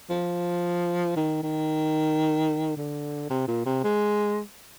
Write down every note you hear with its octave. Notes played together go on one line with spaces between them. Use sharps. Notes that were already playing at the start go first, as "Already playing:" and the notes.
F3
D#3
D#3
D3
C3
A#2
C3
G#3